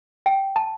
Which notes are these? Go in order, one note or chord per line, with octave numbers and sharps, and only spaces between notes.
G5
A5